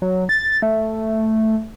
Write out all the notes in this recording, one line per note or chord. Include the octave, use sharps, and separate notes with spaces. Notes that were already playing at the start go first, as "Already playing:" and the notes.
F#3
A6
A3